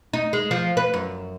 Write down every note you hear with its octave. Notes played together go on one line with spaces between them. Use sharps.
D#4
G#3
F3
B4
F#2